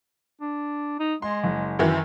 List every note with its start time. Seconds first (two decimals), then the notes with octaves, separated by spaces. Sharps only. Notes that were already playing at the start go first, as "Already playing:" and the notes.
0.41 D4
1.00 D#4
1.22 G#3 C6
1.44 F#1
1.79 F#2 D#3 E3